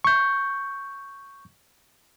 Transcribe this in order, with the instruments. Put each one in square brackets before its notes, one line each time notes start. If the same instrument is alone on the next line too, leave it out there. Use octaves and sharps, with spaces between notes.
[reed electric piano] C#6 G6